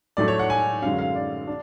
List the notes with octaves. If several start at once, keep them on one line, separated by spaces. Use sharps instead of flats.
A2 F#3 A3 D4 D5
C#5
F#5
G#5
F#2 D3 G#3 C#4 F5
F5
D5
D4